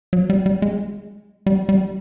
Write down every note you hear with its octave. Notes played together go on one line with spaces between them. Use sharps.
F#3
G3
G3
G#3
G3
G3